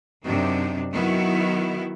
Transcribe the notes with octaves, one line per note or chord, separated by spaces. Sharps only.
F#2 C3 D4 D#4
D#3 F#3 B3 E4 F#4